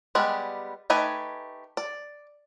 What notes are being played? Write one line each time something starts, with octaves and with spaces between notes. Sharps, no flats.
G3 G#3 B3 G4
A3 D#4 G4 B4 G#5
D5